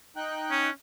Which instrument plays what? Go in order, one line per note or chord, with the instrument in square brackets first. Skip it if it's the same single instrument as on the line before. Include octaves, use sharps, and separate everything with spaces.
[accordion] D#4 G5 F#6
[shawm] C#4